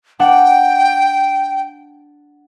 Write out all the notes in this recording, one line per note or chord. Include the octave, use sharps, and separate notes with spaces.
D4 F#5 G5